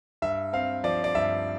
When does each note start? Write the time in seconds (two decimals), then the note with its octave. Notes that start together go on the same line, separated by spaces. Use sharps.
0.22 G2 E5
0.53 C4 F5
0.84 F3 D5
1.04 D5
1.15 G2 E5